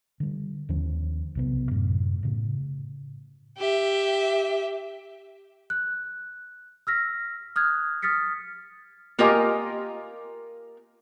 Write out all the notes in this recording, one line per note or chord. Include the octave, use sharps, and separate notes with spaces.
D3 G3
D#2 D3 F3 C#4
B1 C3 B3
F#2 A2 C3
A2 C#3
G4 E5
F#6
E6 F6 A#6 B6
D#6 F6 F#6 G#6
D#6 F6 A6 B6 C#7
A#3 F4 G4 A#4 D#5 G#5